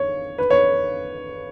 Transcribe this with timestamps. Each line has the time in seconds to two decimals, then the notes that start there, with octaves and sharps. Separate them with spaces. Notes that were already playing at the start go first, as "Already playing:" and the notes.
Already playing: C#5
0.38 B4
0.50 C#5